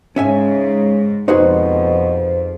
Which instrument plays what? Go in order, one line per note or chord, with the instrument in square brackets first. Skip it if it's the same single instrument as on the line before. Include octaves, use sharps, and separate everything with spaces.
[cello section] G#2 [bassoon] C#3 [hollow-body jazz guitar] C#4 E5 G#5
[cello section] F2 [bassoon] B2 [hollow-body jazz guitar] D#4 F#4 G#4 [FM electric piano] C5